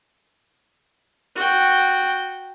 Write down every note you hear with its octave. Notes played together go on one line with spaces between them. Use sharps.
F#4 G5